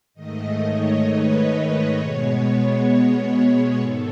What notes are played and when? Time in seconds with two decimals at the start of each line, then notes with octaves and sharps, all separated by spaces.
0.14 G#2 D#3 A3 D#5
0.60 C#5
1.05 B4
1.51 B4
1.97 B2 G#3 B3 C#5
3.80 G#2 D#3 A4